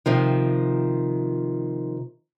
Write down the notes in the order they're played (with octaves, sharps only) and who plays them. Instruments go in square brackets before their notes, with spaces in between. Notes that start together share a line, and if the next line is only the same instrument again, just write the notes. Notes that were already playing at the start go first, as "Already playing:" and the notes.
[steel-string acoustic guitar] C3 D#3 F3